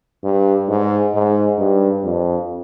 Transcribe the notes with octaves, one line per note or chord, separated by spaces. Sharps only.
G2
G#2
G#2
G2
F2